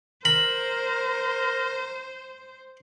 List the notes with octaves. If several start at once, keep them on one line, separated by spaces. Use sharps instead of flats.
A#4 C5 B5